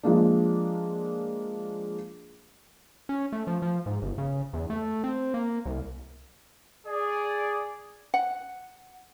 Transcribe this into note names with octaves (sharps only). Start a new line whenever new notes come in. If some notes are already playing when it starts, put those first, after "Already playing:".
F3 G#3 A#3 D4
C#4
A3
F3
F3
G#2
G1
C#3
E2
A3
C4
A#3
C2
G#4 D5
F#5